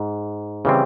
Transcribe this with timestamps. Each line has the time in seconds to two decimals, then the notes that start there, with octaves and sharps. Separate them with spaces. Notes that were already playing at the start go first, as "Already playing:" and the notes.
Already playing: G#2
0.65 C#3 E3 G3 C4